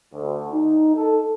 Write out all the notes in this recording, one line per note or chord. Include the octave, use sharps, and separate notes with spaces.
D2
D#4
A4